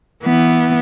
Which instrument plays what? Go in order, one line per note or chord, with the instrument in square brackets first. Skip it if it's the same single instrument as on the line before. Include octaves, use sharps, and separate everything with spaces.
[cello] E3 B3